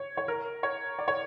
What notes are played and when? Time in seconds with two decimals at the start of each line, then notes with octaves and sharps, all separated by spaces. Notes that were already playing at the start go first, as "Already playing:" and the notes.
Already playing: C#5
0.17 C#5
0.28 A#4
0.63 C#5
0.99 D5
1.08 C#5